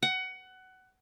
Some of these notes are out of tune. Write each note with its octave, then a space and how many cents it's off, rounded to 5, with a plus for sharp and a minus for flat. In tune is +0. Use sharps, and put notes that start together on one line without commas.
F#5 +20